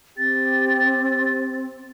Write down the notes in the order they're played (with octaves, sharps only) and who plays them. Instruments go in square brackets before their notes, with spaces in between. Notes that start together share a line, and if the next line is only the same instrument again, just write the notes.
[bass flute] C4 [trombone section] G4 [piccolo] A6